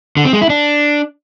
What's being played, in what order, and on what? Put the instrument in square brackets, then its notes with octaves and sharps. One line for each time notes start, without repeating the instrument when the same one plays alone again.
[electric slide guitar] D3
C4
G#3
E4
D4